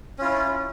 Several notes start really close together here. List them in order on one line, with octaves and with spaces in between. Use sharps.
C#4 F4 E4